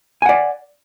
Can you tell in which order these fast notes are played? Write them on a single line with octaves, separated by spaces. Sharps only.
G#5 F#5 D5